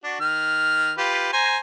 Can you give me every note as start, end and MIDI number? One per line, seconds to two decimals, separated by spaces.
0.04 0.18 62
0.04 0.18 66
0.20 0.92 51
0.20 0.92 89
0.98 1.31 65
0.98 1.31 67
0.98 1.31 71
1.33 1.58 72
1.33 1.58 80
1.33 1.58 82